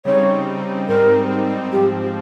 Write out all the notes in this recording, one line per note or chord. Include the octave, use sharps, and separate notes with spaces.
C#3 G3 C4 D#4 C#5
G#2 G3 C4 D#4 A#4
G#2 F3 C4 G4